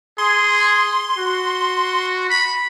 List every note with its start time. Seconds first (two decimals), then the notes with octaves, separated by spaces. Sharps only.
0.18 G#4 C6
1.18 F#4
2.30 B5